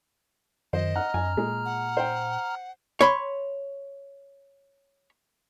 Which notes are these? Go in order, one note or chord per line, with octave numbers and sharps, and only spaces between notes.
F#2 D#3 C5 D#5
F#5 A#5 F6
F#2 G#5
A#2 G#3
F#5
C5 G5
C#5 B5 C6